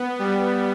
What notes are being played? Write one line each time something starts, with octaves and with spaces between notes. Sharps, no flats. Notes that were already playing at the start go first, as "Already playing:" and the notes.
Already playing: B3
G3